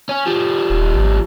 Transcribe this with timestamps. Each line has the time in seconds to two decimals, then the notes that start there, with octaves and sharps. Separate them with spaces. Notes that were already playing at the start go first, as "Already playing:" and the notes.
0.09 C#4
0.26 F3 G3
0.70 D#1
0.94 G#1